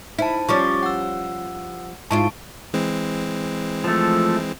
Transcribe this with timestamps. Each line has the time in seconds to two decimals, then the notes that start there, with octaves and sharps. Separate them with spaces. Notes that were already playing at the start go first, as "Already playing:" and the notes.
0.19 D#4 E4 C5 A5
0.49 F3 G3 C#4 C#6 D6 A6
0.83 F#5 E6
2.11 G#2 E4 F4 A5 C#6 D7
2.74 E3 G#3 C4
3.84 F3 A3